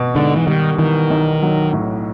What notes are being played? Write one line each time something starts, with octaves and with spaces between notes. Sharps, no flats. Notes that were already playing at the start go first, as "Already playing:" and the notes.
Already playing: B2
G#2 D3
E3
D#3 G3
D#3 E3
B1
F#3
A2